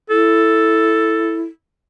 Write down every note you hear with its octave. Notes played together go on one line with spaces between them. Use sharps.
E4 A4